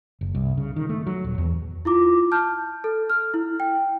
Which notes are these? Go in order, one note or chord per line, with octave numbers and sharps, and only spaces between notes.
F#1
C2
C#3
D#3
A3
F#3
D#1
E2
E4 F4 D6
A5 F6 G6
A4
F6
E4
G5